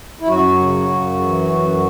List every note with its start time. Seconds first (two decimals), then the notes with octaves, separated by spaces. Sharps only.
0.20 E4
0.27 F#2 F#3 F#4
0.58 C#3
0.90 F#2
1.19 E3
1.51 F#2